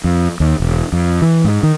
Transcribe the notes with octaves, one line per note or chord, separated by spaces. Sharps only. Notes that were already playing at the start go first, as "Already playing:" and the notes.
F2
D#2
E1
F2
E3
G#2
D#3